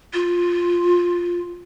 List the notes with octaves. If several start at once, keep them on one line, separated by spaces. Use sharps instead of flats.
F4